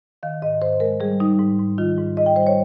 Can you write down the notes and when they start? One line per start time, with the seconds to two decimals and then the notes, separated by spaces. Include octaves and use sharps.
0.23 D#3 F5
0.42 G#2 D#5
0.61 G#2 C5
0.80 G#3 A#4
1.00 G3 G#4
1.20 G3 D#4
1.39 G#2
1.59 G#2
1.78 D#3 F4
1.98 G#2
2.17 G#2 D#5
2.26 G5
2.36 G3 C5
2.47 C#5